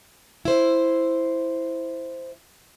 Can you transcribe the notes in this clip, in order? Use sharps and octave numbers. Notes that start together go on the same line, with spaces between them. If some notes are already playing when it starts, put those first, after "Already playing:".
E4 C5